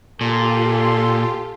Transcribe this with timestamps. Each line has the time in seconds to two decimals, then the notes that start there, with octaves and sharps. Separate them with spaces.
0.21 A#2 F4 G4 A4 G#5 C6